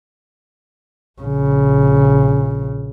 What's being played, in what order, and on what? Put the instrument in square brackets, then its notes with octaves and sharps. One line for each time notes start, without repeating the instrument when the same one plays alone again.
[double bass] A#1 C#3